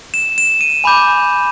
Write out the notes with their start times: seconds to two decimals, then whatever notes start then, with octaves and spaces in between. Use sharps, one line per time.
0.14 E7
0.38 E7
0.61 D#7
0.84 G#5 B5 D6 G6